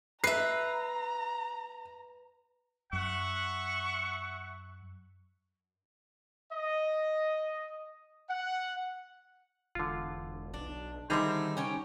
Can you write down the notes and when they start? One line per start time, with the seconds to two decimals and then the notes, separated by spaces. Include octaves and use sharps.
0.24 B4 E5 A#5 C7
2.93 F#2 E5 F#5 C#6
6.52 D#5
8.29 F#5
9.75 E1 D3 F4
10.54 B1 D4
11.10 D3 D#3 G3 C4 D#4 G#4 C5 E5
11.57 C#4 G4 C#5